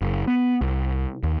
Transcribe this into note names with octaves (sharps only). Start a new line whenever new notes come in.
F#1
B3
C2
D#2